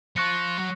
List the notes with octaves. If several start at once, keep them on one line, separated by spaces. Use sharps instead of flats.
F3 C#6 F#6 A#6 C#7
F#3